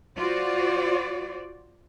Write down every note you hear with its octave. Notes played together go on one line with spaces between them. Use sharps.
F4 F#4 C5 D5